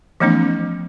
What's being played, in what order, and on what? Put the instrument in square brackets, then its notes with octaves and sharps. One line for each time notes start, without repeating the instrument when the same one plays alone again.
[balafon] E3 F3 A3 B3 C#4 D#4